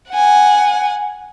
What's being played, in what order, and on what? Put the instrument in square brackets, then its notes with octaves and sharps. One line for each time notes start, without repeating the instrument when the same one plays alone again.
[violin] F#5 G#5